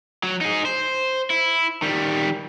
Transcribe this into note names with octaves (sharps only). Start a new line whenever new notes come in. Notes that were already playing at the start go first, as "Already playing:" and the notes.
F#3
D#4 G#4
C5
E4
D#3 G3